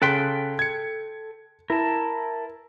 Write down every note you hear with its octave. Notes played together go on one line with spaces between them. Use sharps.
C#3 A4 G5 C6 F#6 B6
G#6 C#7
E4 A#4 A5